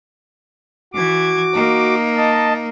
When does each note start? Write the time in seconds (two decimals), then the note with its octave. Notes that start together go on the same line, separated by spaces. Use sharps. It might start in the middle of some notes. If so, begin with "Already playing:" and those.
0.93 E3 F#4 D6 G#6
1.53 A#3 D#4
2.17 D#5 A5